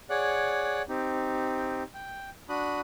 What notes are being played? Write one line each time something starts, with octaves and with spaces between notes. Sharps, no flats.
G#4 C#5 D5 F#5 F#6
C4 D#4 G4
G5
D4 F#4 B5 D#6 F#6